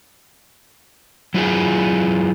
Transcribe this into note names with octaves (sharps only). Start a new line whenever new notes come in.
F#3 E4 F4 G#4